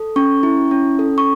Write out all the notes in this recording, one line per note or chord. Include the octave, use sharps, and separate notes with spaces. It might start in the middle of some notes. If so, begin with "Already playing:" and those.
Already playing: A4
C#4 C#6
E4
C#4
A4
C#6